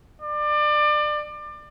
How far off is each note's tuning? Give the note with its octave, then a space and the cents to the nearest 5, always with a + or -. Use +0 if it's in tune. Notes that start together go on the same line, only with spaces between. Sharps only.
D5 +30